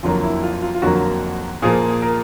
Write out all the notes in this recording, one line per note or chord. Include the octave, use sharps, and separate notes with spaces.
F2 D3 F#3 A#3 F4
E4
F4
F4
F4
F2 D3 F#3 A#3 F#4
A#2 F3 A#3 G#4
A#4